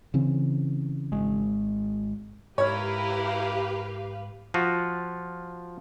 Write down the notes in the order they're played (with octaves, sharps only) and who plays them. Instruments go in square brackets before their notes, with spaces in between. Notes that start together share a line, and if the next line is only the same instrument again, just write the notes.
[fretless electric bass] C#3 E3 C4
[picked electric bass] G#1 G#3
[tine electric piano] G#2 F6 [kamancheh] E4 A#4 [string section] G4 B4 F5 [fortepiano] C#5
[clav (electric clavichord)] F3 F4 F#4